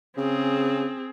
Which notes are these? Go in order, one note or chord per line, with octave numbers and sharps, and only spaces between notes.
C#3 C4 G#4